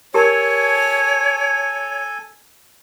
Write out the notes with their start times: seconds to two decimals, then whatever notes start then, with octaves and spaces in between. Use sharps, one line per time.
0.14 G4 A4 A#4 C#5 G#5 A5